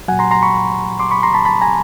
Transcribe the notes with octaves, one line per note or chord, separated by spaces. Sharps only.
A#2 F#3 F#5 G#5
A#5 C6
A#5 C6
B5 C#6
C6 D6
B5 C#6
A#5 C6
A5 B5
A5 B5
G#5 A#5